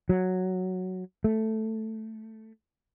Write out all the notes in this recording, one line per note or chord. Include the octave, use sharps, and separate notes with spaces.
F#3
A3